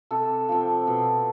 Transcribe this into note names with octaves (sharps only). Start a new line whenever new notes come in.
C3 A4
F3 C4
B2